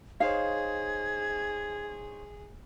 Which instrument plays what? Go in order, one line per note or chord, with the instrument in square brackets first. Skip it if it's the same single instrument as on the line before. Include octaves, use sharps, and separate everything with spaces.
[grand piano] D#4 C5 C#5 [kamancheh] G#4 [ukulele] F5 [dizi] G#6